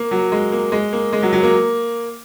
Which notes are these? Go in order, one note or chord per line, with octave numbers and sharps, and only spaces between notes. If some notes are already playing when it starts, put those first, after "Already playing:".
Already playing: A#3
F#3
G#3
A#3
G#3
A#3
G#3
F#3
F#3
A#3